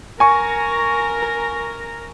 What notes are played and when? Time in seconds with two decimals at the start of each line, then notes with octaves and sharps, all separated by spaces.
0.20 A#4 G#5 A#5 C#6